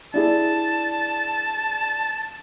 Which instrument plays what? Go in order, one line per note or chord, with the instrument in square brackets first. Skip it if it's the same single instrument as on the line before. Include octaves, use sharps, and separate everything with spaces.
[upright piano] D4 E4 G#4 [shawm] A5